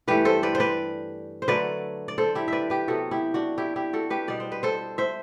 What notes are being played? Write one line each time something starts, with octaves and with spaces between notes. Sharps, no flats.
G2 E3 A3 G4 B4
A4 C5
B4 D5
C5
B4 D5
C5
D3 F#3 A3 B4 D5
D5
A4 C5
E4 G4
B4 D5 E5
G4 B4
C3 F#3 B3 F#4 A4
E4 G4
D4 F#4
E4 G4
E4 G4
F#4 A4
G4 B4
B2 G3 B3 D5
C5
B4
A4 C5
C5 E5